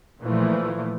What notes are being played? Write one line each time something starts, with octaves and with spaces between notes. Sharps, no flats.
A#2 E3 F3 A3